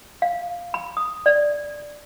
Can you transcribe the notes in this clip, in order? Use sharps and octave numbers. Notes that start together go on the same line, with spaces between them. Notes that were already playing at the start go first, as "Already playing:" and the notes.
F5
B5
D#6
D5